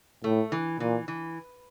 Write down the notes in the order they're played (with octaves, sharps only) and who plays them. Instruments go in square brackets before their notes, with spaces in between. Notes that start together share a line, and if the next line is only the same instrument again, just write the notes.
[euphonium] A2 [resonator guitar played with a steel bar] A3
[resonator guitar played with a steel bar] E3
[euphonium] A#2 [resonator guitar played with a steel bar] E3
[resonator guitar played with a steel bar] E3